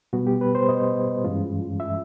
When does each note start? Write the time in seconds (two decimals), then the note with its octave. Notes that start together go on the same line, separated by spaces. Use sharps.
0.13 B2 G3 B3 F#4
0.27 G4
0.41 B4
0.55 C5
0.69 D#5
1.24 G2 E3 G#3 C#4 F4
1.80 E5